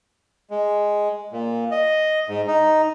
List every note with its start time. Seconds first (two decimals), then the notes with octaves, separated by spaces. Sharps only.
0.50 G#3
1.32 A#2
1.71 D#5
2.28 G#2
2.47 D#4